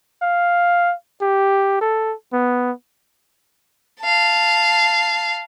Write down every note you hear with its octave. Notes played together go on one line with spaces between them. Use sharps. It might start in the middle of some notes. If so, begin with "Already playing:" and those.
F5
G4
A4
B3
F5 A5